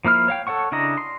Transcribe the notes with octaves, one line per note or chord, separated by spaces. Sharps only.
F3 A#3 E4 F6
C#5 F5 G5
A4 C#5 F#5 C#6
C#3 D4 E4 D#5 A#5
C6